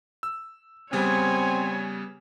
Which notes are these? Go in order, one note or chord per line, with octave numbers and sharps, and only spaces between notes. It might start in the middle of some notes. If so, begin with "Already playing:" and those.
E6
C#3 G3 B3 C4 C#5 G#5